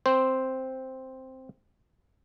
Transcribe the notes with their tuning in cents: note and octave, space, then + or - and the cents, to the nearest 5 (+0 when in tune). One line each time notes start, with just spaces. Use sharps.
C4 +0 C5 +0